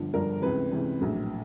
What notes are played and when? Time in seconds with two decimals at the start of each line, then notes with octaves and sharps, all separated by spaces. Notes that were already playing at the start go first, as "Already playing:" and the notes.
Already playing: G1 G2 D3 F3
0.14 G1 G2 D3 F3 A#4
0.42 C#2 C3 E3 B4
0.71 C#2 C3 E3
1.00 A#1 A2 F#3